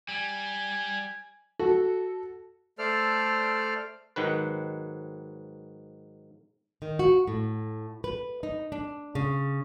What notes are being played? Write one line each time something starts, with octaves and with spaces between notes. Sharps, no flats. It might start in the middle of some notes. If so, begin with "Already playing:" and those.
G3 G#5
F#4 A4
A3 A4 C5 D5 F6
G#2 D#3 F#3 B4
D#3
F#4
A2
B4
D#4
D4
C#3